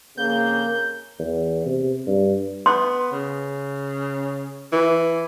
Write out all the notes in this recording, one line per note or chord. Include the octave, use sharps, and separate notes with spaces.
F2 C#3 A#3 G6
E2
C3
G2
B3 C6
C#3
E3